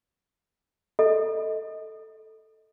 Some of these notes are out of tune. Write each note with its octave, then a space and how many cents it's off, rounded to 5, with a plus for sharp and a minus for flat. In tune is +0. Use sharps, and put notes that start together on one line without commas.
A4 +0 D#5 +20